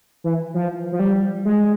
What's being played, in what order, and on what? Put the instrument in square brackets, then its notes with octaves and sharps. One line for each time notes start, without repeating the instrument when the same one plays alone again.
[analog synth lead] E3
F3
F3
G3
G#3